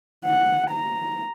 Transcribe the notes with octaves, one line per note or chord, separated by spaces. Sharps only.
F#5
A#5